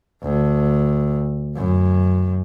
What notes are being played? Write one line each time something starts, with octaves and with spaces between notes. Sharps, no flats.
D2
F#2